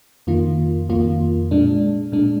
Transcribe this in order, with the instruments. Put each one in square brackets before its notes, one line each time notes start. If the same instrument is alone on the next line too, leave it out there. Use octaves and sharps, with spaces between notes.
[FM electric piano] F2 D#3 A#3 F4
F2 D#3 A#3 F4
A#2 G#3 D4
A#2 G#3 D4